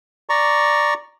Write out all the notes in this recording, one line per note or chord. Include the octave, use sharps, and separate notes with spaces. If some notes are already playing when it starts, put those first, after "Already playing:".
D5 A#5 C#6